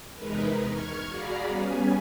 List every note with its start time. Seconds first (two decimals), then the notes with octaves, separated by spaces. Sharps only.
0.16 E2 C3 G#3 D#4 A#4 B4
0.67 C#6 F6 G#6
1.08 F#4 G#4 D5 F5 A#5 B5
1.47 G3 B3 C#4 G#5